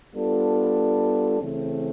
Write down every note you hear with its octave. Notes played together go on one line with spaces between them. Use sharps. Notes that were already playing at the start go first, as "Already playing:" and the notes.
G3 B3 D4 F4 A4
C#3 E3 A3 C4